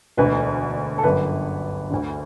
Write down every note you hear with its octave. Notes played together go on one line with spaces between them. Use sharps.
E1 D2 D3 B4
A4
G1 F#2 D3 B4
D2 D3